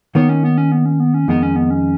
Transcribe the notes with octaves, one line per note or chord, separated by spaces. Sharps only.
D#3 A#3 B3 D#4 A#4 C#5
C#4
B3
C#4
B3
C#4
B3
C#4
F2 D#3 G#3 B3 D#4
C#4
B3
C#4